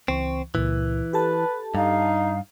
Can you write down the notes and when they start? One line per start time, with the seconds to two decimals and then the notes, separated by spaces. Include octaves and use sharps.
0.08 C#2 E3 C4 C#6
0.55 C#2 A#2 E3
1.13 G4 A4 B4 A5
1.75 G2 D#4 F5